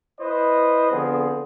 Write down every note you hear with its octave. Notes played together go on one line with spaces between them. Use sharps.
E4 B4 C5 D#5
D3 F3 B3 C4 G#4